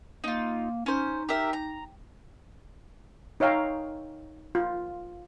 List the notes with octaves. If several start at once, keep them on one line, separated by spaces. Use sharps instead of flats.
A#3 D#4 F4
C#4 D#4 C5
G4 A#4 E5
A#5
D#4 C#5 E5 F5 G5 A#5
F4